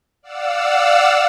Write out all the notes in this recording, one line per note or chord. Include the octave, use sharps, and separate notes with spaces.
D5 F5 F#5 E6